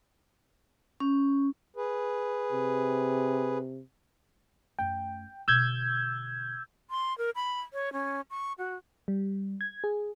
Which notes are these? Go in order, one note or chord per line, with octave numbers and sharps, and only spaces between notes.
C#4
G#4 B4
C3
F#2 A3 G5
B2 D3 E6 G6 G#6
C6
A#4
B5
C#5
C#4
C#6
F#4
G3
G#6
G#4